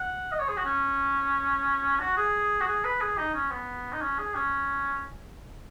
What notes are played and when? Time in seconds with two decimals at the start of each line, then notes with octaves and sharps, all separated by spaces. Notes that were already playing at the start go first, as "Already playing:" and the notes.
Already playing: F#5
0.32 D#5
0.39 C#5
0.49 G#4
0.57 F#4
0.65 C#4
1.99 F#4
2.17 G#4
2.61 F#4
2.67 G#4
2.84 B4
3.01 G#4
3.18 D#4
3.34 C#4
3.50 B3
3.93 D#4
4.01 C#4
4.18 G#4
4.35 C#4